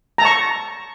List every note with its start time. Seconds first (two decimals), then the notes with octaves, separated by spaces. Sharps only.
0.18 A#5
0.22 A5
0.25 C#6